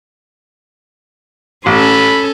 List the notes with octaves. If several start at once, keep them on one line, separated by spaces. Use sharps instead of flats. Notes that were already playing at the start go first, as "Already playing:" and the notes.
A1 C#4 A4 B5